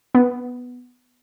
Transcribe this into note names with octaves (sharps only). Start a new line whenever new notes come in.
B3